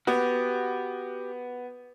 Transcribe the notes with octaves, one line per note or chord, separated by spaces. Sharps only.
B3 F#4 G4